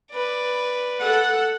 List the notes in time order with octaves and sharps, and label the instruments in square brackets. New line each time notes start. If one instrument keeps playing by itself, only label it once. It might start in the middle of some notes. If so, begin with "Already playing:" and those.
[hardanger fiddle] B4 D5
[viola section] A4 F#5